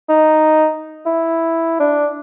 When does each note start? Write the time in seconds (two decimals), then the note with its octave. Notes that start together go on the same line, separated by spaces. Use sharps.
0.09 D#4
1.06 E4
1.80 D4